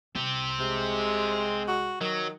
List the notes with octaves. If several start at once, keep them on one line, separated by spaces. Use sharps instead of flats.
C2 C4 G4
C3 G#3
F#4
D#3 F#3